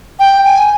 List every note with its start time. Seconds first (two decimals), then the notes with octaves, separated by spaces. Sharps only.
0.19 G5
0.45 G#5